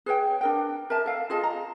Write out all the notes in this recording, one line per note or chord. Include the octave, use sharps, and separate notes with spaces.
G#4 B4 C#5 G5
D4 A#4 G5
A#4 E5 A5
A4 F5
F4 G#4 D#5 A5
A#5